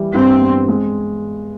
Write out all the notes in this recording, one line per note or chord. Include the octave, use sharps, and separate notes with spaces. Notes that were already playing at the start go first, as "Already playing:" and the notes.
Already playing: E3 G3
G2 C4
B3
G#3